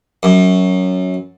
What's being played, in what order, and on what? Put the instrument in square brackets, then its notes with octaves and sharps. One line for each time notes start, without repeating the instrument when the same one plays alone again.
[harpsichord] F#2